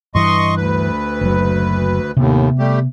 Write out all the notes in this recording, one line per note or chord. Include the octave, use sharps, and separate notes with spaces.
G2 E3 D#5 C6 C#6
D2 B4
F#1 F#3
D#2 A2 C3 B3
G3 A3 G4